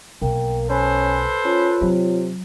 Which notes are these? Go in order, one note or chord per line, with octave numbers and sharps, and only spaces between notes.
B1 A#3 G5
C#4 A4 B4 C5 G#5
C#4 F4 C#5
C3 F#3